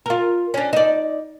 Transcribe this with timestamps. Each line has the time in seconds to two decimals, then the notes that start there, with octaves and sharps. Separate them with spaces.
0.06 F4 A#4
0.54 C#4 D4
0.73 D#4 D5